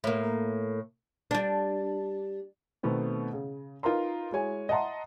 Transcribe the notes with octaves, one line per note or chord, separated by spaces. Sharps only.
A2 A#3
G3 D4
B2 D#3 A3 B3 C4
C#3
D#4 F4 A#4 B4 A#5 C6
G#3 E4 F#4 C#5 G#5
D#5 E5 F#5 A5 A#5 C6